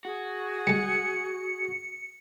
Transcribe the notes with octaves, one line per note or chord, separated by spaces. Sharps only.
F#4 G#4
G3 G#3 C#7